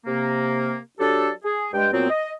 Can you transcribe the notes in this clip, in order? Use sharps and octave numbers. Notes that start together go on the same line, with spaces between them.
C3 A#3
F#3 D4 G4 A4
G#4
G2 G#3 G5
A#2 F#3 B3 C4
D#5